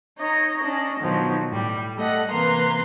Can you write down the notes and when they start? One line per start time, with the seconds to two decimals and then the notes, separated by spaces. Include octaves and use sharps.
0.19 D#4 C#5 D#5
0.63 C#4 D4 D#5
1.01 B2 D#3 F3 F#3
1.51 A2 G3
1.95 G3 A3 A4 D#5 F#5
2.31 C3 E3 A#3 B4 A#5 C6